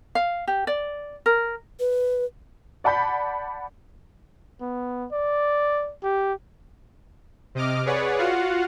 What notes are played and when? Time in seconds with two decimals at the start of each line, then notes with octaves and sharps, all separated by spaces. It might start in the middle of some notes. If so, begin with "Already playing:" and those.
0.15 F5
0.48 G4
0.67 D5
1.26 A#4
1.80 B4
2.84 D5 F#5 A5 B5 G6 B6
4.61 B3
5.12 D5
6.03 G4
7.55 C3 D#5 D6 F6
7.85 G#4 B4 C#5 D5 F#5
8.18 F4 F#4 F5 F#5